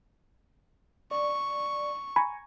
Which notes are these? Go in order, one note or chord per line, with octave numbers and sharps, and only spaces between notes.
D5 C#6
G#5 A#5 B5 C#6